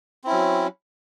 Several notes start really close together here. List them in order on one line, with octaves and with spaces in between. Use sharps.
C4 E4 C#4 F#3